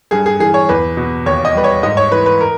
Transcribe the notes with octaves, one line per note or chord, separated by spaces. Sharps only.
G2 G#4
G#4
E3 G#4
C#5
E2 B4
B2
D#2 C#5
D#5
G3 B4
C#5
G#2 D#5
C#5
E3 B4
B4
A#4